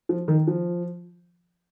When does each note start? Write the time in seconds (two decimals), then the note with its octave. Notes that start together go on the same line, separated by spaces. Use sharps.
0.09 F3
0.28 D#3
0.47 F3